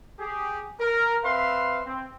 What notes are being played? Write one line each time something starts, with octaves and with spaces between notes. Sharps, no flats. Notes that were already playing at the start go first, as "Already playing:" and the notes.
G4 G#4
A#4
C4 B4 E5 F5 C6
C4